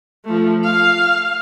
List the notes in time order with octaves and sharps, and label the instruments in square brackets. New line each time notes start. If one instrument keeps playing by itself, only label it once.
[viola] F3 A3
F5